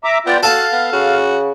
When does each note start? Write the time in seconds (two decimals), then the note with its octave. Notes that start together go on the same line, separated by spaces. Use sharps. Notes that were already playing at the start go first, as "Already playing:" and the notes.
0.04 E5 A#5 D6
0.27 B3 F4 D5 G5
0.43 F#4 A4 F5 A5
0.72 B3
0.92 C#3 F#4